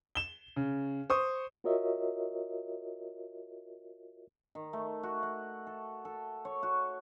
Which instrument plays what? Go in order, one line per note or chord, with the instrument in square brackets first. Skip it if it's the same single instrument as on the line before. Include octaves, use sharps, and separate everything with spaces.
[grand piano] E7 G7
C#3
C5 C#6 D#6
[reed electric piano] F4 F#4 A#4 C#5 D#5 E5
[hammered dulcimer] D#3
A3
F#4
F#5
A4
A4
C#5
F#4